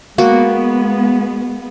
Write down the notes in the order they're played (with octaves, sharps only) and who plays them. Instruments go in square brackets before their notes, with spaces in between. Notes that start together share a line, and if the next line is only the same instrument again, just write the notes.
[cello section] G#3 B3 [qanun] A#3 F#4